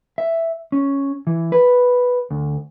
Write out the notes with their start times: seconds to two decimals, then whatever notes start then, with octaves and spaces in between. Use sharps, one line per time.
0.18 E5
0.72 C#4
1.27 E3
1.52 B4
2.31 D2